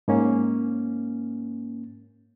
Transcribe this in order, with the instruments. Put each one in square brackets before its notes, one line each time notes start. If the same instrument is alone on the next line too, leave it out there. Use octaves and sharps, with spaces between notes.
[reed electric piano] G#2 A#3 C#4